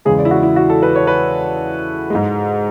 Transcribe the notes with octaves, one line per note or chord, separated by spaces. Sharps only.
E2 C#3 G#3 G#4
D5
E4
F#4
E4
F#4
A4
B4
C#5
B4
G#2 G#3